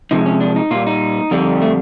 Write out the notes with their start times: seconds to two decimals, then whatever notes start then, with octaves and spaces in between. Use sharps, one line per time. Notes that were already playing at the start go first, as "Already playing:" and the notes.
0.11 C3 F3 G#3 D#4
0.26 C#4
0.41 D4
0.56 D#4
0.71 A#2 G3 F4
0.87 D#4
1.31 F2 D3 G3
1.62 A3